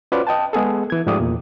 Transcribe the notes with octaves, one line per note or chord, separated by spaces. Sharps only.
C#4 F4 F#4 B4 C5 D5
D#5 G5 A5
G#3 B3 G#4 A4
E3 G#6
G#2 F3 A3 G4 D5 D#6
E2 A#2